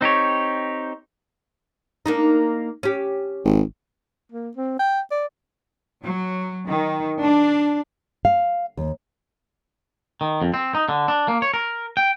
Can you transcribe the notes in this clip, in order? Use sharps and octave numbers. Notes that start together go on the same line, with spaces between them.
C4 D#4 G4 C#5
A#3 D4 D#4
C#4 G4
G#1
A#3
C4
G5
D5
F#3
D#3
D4
F5
D#2
D#3
F2
C4
D#4
D3
D4
A#3
C#5
A#4
G5